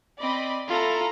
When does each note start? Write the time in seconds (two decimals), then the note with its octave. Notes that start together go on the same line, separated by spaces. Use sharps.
0.20 C4 D5 D#5 B5
0.68 E4 F4 A4 A#5